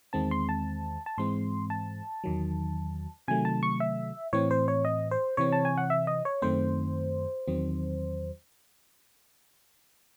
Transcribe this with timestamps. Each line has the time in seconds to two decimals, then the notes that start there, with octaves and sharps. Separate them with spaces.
0.13 E2 D#3 G#3 C4 A5
0.31 C6
0.49 A5
1.06 A5
1.18 G#2 E3 G#3 C4 C6
1.70 A5
2.24 E2 D#3 F#3
3.28 C3 D#3 F#3 A3 G#5
3.45 A5
3.63 C#6
3.80 E5
4.33 A2 E3 C4 C#5
4.51 C5
4.68 C#5
4.85 D#5
5.11 C5
5.37 C3 E3 C4 C#5
5.52 A5
5.65 G#5
5.78 F#5
5.90 E5
6.07 D#5
6.25 C#5
6.42 F#2 D#3 A3 C4 C5
7.47 E2 D#3 F#3 C4